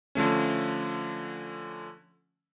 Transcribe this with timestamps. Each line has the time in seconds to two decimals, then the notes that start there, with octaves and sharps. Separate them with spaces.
0.15 D3 F3 A3 C#4